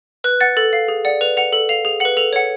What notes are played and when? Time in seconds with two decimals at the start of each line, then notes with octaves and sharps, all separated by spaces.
0.24 B4 F#6
0.40 F#5 A6
0.57 A4 A6
0.73 F5
0.88 G#4
1.05 D5 F#5
1.21 B4 F7
1.37 F#5 F7
1.53 A4 F#7
1.69 F5 F7
1.85 G#4 F7
2.00 B4 F#5 F#7
2.17 A4 F7
2.33 C#5 F#5